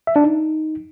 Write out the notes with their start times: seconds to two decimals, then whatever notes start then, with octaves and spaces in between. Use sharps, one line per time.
0.07 E5
0.16 D4
0.24 D#4